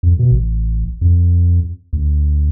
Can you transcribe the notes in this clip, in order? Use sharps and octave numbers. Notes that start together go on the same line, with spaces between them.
F2
B2
A1
F2
D2